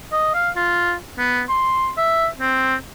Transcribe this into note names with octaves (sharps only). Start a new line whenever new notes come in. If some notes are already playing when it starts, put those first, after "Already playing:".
D#5
F5
F4
B3
C6
E5
C4